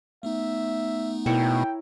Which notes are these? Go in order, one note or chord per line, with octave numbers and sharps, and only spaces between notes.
A3 B3 D#4 E5
B2 E4 A#4 C#5 G5